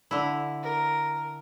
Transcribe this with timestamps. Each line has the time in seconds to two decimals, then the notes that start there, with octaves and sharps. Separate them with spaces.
0.11 D3 E4
0.63 A#4